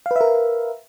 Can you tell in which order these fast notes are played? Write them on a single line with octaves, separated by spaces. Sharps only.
F5 B4 E5 A#4